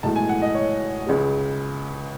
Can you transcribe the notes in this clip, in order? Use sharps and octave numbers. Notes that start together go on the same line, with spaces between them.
B1 A2 E3 G#3 A5
G#5
F#5
D#5
C#5
C#2 C#3 G#3